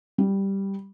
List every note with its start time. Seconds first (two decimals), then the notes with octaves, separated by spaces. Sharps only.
0.18 G3